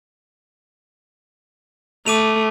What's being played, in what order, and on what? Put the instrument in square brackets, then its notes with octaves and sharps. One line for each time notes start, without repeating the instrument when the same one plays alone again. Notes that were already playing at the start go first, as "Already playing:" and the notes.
[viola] A3 [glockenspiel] D6 D#7 F7